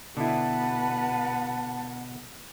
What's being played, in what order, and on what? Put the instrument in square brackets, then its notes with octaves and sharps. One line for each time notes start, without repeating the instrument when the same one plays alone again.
[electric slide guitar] B2 [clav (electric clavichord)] D3 E4 [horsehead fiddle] B4 F#5 [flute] A5